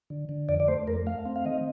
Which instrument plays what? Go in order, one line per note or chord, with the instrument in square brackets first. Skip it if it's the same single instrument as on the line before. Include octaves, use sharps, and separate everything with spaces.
[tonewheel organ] D3
D3
F2 D5
D5
A3 C5
F2 A#4
A3 F5
C4
F5
D#3 D#5